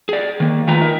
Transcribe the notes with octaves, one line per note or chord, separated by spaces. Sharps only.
G#4 D5
D#3 A#3
F2 D#3 A3 F4 B4 A#5
D#4 A#4 E5